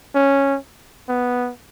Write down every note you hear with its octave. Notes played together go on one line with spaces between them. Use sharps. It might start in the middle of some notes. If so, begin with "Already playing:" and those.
C#4
B3